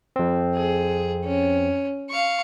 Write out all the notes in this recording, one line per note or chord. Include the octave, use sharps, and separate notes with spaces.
F2 C4
G#4
C#4
F5 C#6